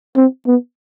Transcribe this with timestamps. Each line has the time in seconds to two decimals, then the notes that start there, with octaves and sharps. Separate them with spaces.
0.16 C4
0.47 B3